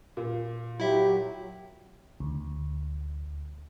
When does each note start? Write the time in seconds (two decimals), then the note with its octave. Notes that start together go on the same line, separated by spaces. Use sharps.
0.17 A#2
0.80 F#3 E4 G4 E5
2.20 D2